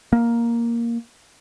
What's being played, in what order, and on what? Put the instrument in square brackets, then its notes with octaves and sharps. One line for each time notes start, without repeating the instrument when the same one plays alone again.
[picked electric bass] A#3